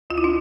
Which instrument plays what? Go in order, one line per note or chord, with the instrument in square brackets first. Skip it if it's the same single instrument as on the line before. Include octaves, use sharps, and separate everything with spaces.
[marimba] D2 F4
E4
D4